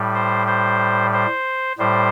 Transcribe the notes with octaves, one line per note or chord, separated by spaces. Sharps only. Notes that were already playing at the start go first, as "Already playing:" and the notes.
Already playing: A2 G3
C5
C5
C5
A2 G3 C5